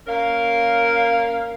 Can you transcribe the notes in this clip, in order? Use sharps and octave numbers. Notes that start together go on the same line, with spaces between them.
A#3 C#4 A#4 F5